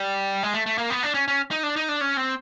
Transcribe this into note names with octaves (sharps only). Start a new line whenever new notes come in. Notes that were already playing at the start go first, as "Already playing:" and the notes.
Already playing: G3
G#3
A3
A3
A#3
B3
D4
C#4
C#4
D#4
D4
D#4
D4
C#4
C4